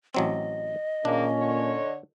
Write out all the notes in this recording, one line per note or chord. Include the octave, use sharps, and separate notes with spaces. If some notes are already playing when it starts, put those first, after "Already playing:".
A1 F#3 C4 D#5
A#2 D#3 G#3 A#3 C#4 D4
D3 C#5